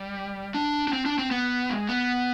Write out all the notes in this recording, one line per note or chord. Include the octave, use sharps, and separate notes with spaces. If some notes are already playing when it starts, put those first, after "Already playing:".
Already playing: G3
D4
D4
C4
D4
C4
B3
G#3
B3